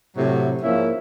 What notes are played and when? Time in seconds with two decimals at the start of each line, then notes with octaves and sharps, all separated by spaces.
0.16 A2 C3 F#3
0.61 G#2 F3 A#3 C#4 E4 E5